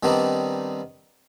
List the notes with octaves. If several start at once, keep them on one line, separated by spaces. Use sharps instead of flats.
D#3 G3 B3 C4 D4 D#4